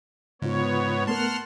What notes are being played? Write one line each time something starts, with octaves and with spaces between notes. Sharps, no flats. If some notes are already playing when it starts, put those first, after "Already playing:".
G#2 C#3 B3 F4 C#5
A3 B3 A#4 F#5 A5 C6 F6